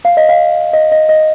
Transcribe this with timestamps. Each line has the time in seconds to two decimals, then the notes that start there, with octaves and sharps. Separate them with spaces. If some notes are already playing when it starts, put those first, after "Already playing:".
0.05 F5
0.17 D#5
0.29 F5
0.73 D#5
0.92 D#5
1.09 D#5